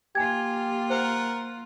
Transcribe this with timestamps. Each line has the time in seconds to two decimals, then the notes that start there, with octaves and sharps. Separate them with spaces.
0.15 A#3 F4 G4 G#5 G#6
0.90 A#4 C5 F#5